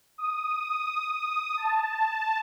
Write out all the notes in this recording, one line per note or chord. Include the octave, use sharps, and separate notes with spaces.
D#6
D#6
A5